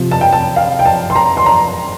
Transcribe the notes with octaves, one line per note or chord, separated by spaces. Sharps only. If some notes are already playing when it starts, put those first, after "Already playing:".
Already playing: C3 F3
A5
G5
A5
F5
G5
A5
C6
A#5
C6
A#5